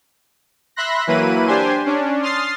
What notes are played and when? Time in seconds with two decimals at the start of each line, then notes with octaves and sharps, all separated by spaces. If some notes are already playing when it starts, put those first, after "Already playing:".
0.76 E5 B5 C6 F#6 A#6
1.07 E3 F#3 A#3 E4 B4 D#7
1.47 D4 G4 C5 G#5 C6
1.85 C#4 D4
2.22 C6 D#6 F6 A6 C7